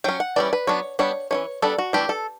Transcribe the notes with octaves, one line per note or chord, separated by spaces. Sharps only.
F#3 C#4 G5
F#5
E3 G3 C#4 D5
B4
F#3 B3 D4 C#5
G3 B3 D4 C#5
E3 A3 C#4 C#5
G3 B3 D4 A4
F#4
E3 A3 D4 G4
A4